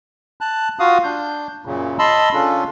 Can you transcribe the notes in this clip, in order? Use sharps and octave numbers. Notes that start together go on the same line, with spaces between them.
A5 F#6
F4 F#4 F5 D#6
D4 G6
F#2 A#2 C#3
D#5 A5 B5 C6 E6
C#3 C#4 D4 F4 A4